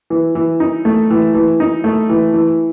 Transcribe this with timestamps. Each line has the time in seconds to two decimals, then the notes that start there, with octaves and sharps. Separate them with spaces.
0.10 E3
0.35 E3
0.60 D#4
0.85 A3
1.10 E3
1.34 E3
1.60 D#4
1.84 A3
2.09 E3
2.34 E3